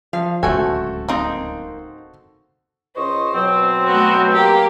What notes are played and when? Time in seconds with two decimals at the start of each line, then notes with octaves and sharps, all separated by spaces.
0.13 F3 F5
0.43 D1 C#2 B2 A3 F#4 A4 C5 G#5
1.08 A#3 C4 D#4 D#5
2.97 C#2 C5 D#5 C#6
3.34 B2 F#3 C4
3.87 A3 B3 F#4
4.32 A#3 G4